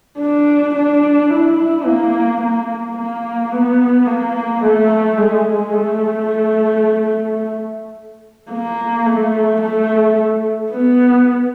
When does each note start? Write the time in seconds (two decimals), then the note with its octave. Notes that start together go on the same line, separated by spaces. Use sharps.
0.19 D4
0.75 D4
1.30 E4
1.86 A#3
2.41 A#3
2.97 A#3
3.52 B3
4.07 A#3
4.62 A3
5.18 G#3
5.73 A3
8.50 A#3
9.06 A3
9.61 A3
10.72 B3